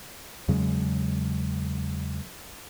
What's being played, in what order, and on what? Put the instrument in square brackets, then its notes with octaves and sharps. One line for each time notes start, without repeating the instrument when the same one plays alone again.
[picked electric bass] E2 C#3 F#3 G#3